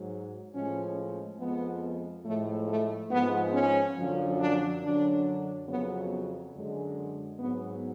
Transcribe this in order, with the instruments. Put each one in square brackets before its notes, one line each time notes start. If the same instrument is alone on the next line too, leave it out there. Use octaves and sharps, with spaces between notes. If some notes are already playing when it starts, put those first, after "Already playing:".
Already playing: [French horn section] G#2 F#3
A2 F3 G#3 C#4
F2 F3 G#3 B3
A2 F3 G#3 A3
A3
G#2 F3 G#3 B3
C#4
F#2 D3 F3
D4
F#2 D3 F#3 D4
F2 C#3 F#3 B3
F#2 D3 G#3
G#2 F#3 B3